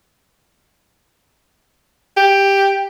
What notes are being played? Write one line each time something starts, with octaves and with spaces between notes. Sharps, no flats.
G4